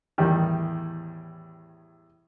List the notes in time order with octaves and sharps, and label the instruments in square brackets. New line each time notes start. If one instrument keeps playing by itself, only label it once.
[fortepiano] E2 A2 D#3 G3